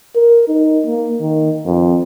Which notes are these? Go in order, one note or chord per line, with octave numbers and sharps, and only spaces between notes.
A#4
D#4
A#3
D#3
F2